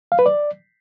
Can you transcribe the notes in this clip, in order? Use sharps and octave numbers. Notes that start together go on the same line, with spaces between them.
F5
B4
D5